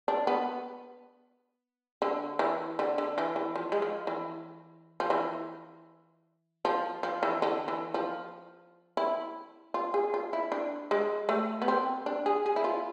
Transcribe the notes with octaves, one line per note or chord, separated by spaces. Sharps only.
D4
B3
D3
E3
D3
D3
E3
E3
F3
G#3
F3
E3
F3
E3
F3
F3
E3
D3
E3
F3
E4
F4
G#4
F4
E4
D4
G#3
A3
B3
C4
D4
G#4
G#4
E4
F4